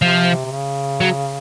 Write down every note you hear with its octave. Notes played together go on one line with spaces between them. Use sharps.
C3 F3
C3
C#3
F#3